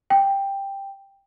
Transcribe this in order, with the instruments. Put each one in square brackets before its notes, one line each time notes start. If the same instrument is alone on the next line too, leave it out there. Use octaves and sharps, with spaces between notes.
[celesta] G5